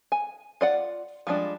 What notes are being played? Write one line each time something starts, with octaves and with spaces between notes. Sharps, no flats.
G#5
F4 D5 F#5
F3 G3 G#3 D4